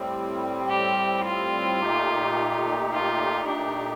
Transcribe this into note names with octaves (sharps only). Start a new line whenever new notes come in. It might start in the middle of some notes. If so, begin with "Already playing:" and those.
Already playing: A2 G3 C4
G4
F4
A#2 A3 D#4 G4
F4
D4